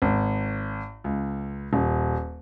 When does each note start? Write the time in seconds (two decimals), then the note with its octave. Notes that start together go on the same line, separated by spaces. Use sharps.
0.02 G#1
1.04 C#2
1.73 D#1